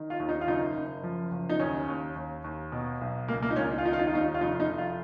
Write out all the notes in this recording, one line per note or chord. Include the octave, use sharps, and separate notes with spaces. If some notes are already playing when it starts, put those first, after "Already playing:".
Already playing: D#3
F4
D#2
D#4
F4
F#1 D#4
F#1
F3
F#1
D#4
D#2 C#4
D#2
D#2
D#2
B2
B1
C#2 A#3
A#3
D#4
C#2 C#4
D#4
F4
D#3 D#4
F4
D#4
F4
D#2 D#4
F4
F1 D#4
D#4
F1
F4